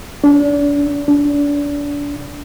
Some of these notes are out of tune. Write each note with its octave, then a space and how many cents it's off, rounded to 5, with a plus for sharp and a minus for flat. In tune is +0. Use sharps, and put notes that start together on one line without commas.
D4 -35
D4 -30